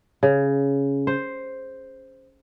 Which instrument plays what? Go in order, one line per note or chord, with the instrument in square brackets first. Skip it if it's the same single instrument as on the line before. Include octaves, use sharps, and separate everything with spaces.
[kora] C#3
C5